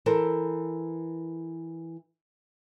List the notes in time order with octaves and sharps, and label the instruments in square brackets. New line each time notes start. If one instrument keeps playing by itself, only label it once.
[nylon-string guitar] E3 A4 A#4 C5